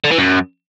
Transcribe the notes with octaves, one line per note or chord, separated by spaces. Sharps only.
D3
E3
F#2